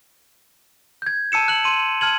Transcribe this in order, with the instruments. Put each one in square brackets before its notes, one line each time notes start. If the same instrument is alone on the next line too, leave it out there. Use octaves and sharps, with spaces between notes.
[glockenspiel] G6 G#6
A5 E6 C#7 E7
F#6 F#7
C6 D#7
A5 F6 G#6 F#7